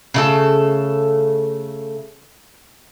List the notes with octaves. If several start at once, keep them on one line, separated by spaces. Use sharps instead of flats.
C#3 A3 A4